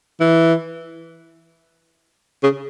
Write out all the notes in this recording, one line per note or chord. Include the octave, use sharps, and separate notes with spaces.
E3
C#3